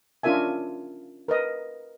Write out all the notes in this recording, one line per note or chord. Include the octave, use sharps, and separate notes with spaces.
C#4 D4 F4 A#4 E5 G#5
A#4 B4 D#5